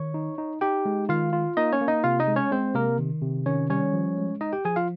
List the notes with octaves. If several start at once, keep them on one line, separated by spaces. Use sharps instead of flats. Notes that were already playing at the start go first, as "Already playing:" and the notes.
Already playing: D#3 C#5 C#6
D#4
D#4
D#4 G4 G5
G#3
D#3 F4 F5
F4
A#3 D#4 D#5
C#4 C#5
A#3
D#4 D#5
C3 F4 F5
D#4 D#5
G#3
C#4 C#5
G#3 C4 C5
C3 A#3 A#4
D#3
C3
D#3 C#4 C#5
G3 C#4 C#5
F3
G#3
D#4 D#5
G4 G5
F3 G#4 G#5
F4 F5